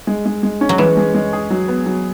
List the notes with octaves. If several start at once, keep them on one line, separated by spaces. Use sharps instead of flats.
G#3
G#3
G#3
C#4
F#3
E3 G#3
G#3
G#3
G#4
F#3
B3
F#3